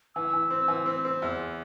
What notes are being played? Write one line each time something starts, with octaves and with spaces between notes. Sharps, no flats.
E3 E6
E3
C4
E3
C4
C4
E2